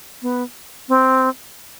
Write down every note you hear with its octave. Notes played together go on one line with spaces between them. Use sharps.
B3
C4